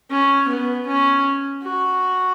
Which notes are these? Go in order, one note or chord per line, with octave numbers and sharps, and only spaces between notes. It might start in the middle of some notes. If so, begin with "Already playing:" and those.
C#4
B3
C#4
F#4